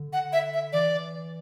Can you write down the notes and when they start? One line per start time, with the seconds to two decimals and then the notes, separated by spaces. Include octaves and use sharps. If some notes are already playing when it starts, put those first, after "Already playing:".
Already playing: D3
0.13 F#5
0.33 E5
0.54 E5
0.73 E3 D5